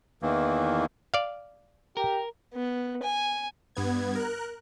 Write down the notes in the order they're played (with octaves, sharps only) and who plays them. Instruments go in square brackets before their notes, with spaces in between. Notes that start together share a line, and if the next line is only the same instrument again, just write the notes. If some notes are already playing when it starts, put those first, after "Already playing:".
[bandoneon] E2 D#3 E3 A#3
[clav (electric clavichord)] D5 F5
[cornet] G4 [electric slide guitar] A#4
[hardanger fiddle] B3
G#5
[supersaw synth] G2 B3 G#6
A#4 F#6